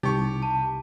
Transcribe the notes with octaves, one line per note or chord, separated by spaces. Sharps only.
C2 D#4 E4 G4 C#6
A5